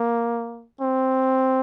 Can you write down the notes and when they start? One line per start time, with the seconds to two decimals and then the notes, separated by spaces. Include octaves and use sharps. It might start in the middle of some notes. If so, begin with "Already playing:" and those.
Already playing: A#3
0.81 C4